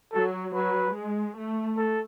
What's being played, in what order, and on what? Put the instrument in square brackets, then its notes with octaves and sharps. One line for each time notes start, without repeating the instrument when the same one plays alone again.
[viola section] F#3 [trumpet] A4
[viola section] F#3 [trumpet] B4
[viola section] G#3
A3
[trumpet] A4